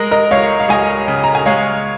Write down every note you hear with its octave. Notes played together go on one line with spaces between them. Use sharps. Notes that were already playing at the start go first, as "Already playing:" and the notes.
Already playing: G#3 A#4 D#5
A#4 D#5
C#2 C#5 F5
F5
C#2 D#5 G#5
C#3
A#5
G#5
G#3 C#5 F5